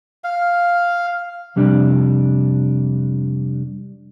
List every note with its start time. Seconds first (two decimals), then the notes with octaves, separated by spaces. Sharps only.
0.24 F5
1.56 F2 C3 G3 D4